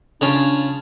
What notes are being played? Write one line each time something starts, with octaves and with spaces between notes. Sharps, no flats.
C#3 C#4 D4 F4